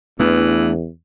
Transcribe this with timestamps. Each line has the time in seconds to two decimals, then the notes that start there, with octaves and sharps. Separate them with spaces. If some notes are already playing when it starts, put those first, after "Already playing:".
0.20 E2 E3 A3 B3 D4